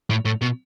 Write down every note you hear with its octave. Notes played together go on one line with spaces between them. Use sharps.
A2
A2
B2